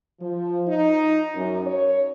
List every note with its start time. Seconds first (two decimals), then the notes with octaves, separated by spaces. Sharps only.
0.20 F3
0.67 D#4
1.35 F#2
1.67 C#5